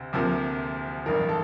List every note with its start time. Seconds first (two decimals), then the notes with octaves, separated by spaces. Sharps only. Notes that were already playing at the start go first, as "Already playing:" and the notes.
Already playing: D2 C3
0.13 D2 C3 F3 A#3
1.06 A1 G2 D#3 A#4
1.29 A4